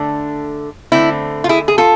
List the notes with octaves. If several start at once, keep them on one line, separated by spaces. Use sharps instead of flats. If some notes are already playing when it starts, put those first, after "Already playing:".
Already playing: D3 A3 D4
D3 A3 C4 E4
F4
E4 G#4
G#4
F4 A4